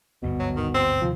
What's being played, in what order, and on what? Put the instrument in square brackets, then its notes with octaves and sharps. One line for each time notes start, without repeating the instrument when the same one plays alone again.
[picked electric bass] G#1 D2 G2 [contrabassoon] B2
[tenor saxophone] F#3
D#3
C4
[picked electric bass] D#2 C3 D#3 [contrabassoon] F3